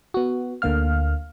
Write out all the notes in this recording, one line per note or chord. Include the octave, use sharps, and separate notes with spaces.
B3 F#4
D2 D3 A#3 F5 F6